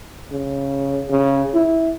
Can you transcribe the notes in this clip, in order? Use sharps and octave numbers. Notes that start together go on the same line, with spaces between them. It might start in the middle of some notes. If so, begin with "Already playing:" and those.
C#3
C#3
E4